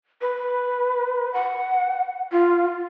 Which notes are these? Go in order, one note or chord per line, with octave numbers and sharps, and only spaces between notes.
B4
F#5
F4